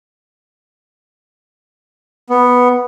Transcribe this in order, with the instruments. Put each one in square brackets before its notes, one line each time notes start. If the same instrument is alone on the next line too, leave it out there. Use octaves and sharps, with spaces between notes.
[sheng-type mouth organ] B3